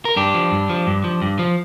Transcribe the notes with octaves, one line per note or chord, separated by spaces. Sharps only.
A#4
G2 D4 G4
F3
G2
F3
G2
F3
G2
F3